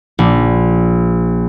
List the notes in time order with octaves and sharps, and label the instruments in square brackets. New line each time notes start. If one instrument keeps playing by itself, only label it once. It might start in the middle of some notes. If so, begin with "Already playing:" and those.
[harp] A#1